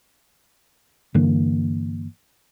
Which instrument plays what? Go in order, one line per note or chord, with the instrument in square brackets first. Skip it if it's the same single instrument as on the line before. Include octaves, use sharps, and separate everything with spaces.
[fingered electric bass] G2 D3 E3 A#3